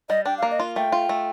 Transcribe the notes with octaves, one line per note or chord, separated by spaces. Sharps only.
G3 D#5
D4 G5
F5
A#3
D#5
F4
A3 G5
F4
A3